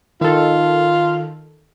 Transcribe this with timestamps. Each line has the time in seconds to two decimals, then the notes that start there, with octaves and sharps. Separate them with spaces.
0.21 D#3 F4 A4